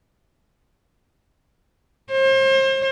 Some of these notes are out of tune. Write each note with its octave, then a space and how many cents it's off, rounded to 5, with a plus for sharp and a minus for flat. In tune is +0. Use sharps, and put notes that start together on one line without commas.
C5 +35